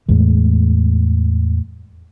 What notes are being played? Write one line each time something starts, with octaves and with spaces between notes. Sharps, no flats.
E2 A2 G#3